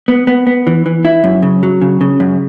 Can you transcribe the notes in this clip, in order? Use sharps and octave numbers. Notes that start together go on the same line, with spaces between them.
B3
B3
B3
E3
E3
E4
F#2
C#3
F#3
C#3
C#3
F#2